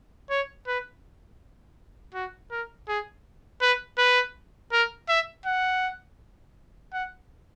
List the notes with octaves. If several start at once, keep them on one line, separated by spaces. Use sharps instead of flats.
C#5
B4
F#4
A#4
G#4
B4
B4
A#4
E5
F#5
F#5